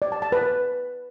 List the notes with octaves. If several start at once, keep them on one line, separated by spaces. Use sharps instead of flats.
D5
A5
A5
B4